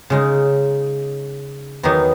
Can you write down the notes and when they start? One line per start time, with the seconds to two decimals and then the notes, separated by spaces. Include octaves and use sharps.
0.10 C#3 G#3 D#4
1.83 E2 D#3 F#3 B3 D#4